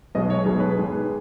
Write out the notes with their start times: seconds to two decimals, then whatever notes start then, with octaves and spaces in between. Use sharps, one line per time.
0.15 B1 B2 G#3 D#5
0.30 C#5
0.45 B1 B2 G#3 G#4
0.60 B4
0.75 G#1 G#2 G#3